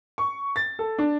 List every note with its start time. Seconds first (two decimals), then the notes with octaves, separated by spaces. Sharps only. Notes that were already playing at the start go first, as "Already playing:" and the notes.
0.18 C#6
0.56 A6
0.79 A4
0.98 D4